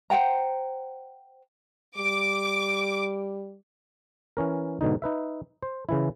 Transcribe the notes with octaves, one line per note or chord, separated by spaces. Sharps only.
C5 F#5 G5 A#5
G3 D6
E3 C#4 A#4
G#2 B2 D3 D#4
D#4 B4 E5
C5
C#3 E3 E4